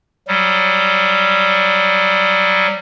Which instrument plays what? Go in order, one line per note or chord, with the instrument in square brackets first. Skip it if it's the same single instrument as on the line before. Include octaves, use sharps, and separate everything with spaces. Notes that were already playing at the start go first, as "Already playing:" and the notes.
[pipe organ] F#3 G3